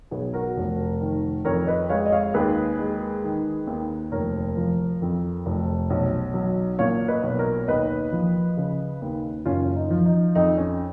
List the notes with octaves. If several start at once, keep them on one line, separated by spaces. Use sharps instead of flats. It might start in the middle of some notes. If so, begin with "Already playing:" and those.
B1 G#4 B4
F#4 A#4
F1
D#3
F2 A#4 C#5
B4 D#5
G#3 C#5 F5
D#5
C#5 F5
D#2 G#4 B4
G#3
D#3
D#2
F1 A#4 C#5
F3
F2
F1
B1
F#3
A#2 C#5 F5
B4 D#5
B1
A#4 C#5
D#2 B4 D#5
F3
C#3
D#2
F#1 C#4 F4
D#4
F3
D#4
F2 D#4
C#4